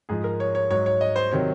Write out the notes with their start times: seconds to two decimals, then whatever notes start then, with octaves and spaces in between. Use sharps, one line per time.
0.09 G#2 F3 G#4
0.24 A#4
0.40 C#5
0.55 C#5
0.70 G#2 F#3 C#5
0.86 C#5
1.01 D#5
1.16 C5
1.31 C3 D#3 F#3 C#5